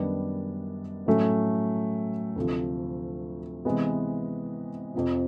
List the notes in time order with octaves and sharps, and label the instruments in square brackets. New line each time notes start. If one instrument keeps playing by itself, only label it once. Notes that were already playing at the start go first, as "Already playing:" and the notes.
Already playing: [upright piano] F#2 D#3 G3 B3 D4
A2 F#3 A3 C#4
D2 C3 F3
C3 E3 G#3 B3
F2 C3 F3